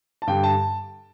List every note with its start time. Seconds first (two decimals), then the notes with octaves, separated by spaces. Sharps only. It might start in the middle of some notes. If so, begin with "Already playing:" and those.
0.22 A5
0.27 G2 D3 G3 G5
0.43 A5